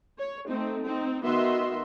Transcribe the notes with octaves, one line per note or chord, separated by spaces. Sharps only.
C#5
A3 C4 D#4
C4 D#4
D#3 B3 F#4 D#5 E5 C6